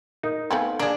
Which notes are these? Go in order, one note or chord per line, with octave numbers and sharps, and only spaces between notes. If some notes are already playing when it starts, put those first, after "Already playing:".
D#4 A#4
A3 B3 C4 F5 G#5
A#3 D4 G#4